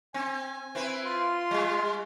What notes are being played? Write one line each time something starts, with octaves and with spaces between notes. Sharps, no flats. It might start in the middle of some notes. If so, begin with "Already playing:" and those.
C4 G#5
C4 E4 B4
F4 C6
G3 G#3